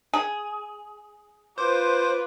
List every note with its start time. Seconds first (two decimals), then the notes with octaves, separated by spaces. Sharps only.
0.14 G#4
1.58 F4 B4 C5 D6